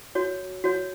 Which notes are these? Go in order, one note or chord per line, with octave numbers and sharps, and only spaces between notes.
F#4 C#5
F#4 C#5